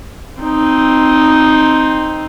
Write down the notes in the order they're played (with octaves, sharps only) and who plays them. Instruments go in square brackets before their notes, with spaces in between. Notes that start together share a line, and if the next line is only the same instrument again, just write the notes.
[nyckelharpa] C4 D#4